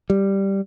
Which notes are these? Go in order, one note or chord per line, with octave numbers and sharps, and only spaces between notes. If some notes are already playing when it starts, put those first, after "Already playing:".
G3